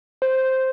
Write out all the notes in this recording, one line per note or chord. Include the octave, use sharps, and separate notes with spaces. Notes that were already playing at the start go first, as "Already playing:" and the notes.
C5